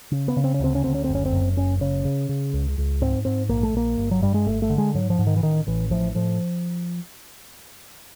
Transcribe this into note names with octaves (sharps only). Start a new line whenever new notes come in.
C#3
B3
C#3
C4
C#4
D2 C4
C#4
D2 C4
C#4
F#1 C4
C#4
C4
F#2
F#1 C#4
C#3 C#4
C#3
C#3
C#2
C#2
G#2 C4
G#2 C4
A#1 A#3
A3
A#1 A#3
G1
F#3
G2 G3
G#3
G1 A3
A3
D3
G#3
G#2 F#3
F3
G#2
D#3
E3
A1 D#3
A1 E3
A2 F3
A2 F3